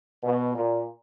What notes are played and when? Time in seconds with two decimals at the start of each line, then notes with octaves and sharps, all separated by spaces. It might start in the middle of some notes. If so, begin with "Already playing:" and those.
0.23 B2
0.55 A#2